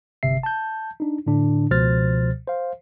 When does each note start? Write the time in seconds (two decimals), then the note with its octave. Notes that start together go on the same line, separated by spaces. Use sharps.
0.23 G1 C3 E5 C7
0.43 A5 G6
1.00 D4 D#4
1.26 A2 D3 D4
1.71 C#2 B2 F3 C5 F6 A6
2.48 C5 F5